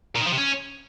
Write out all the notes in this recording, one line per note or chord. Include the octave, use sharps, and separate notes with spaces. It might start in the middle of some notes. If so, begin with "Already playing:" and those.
A#2
D#3
F3
C3
C#4